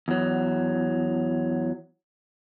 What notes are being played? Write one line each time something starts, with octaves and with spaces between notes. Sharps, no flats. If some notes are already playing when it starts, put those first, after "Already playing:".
E2 F#3